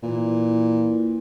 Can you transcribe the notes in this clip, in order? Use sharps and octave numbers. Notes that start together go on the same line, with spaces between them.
A#2 E3